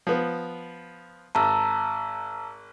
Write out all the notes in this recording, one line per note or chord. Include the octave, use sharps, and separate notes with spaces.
F3 B3
G#1 A5 A#5 E6